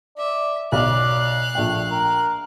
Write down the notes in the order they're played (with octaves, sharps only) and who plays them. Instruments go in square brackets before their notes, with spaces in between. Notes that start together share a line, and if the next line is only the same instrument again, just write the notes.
[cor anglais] D5 [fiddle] E5
[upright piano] B1 [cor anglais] D5 [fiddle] F5 F#6
[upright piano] A#1 G5 [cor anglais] A3
[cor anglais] A#4